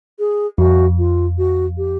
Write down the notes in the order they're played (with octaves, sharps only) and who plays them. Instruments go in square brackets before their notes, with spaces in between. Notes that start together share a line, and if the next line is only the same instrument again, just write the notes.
[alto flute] G#4
[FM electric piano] F2 [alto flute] F#4
[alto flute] F4
F#4
G4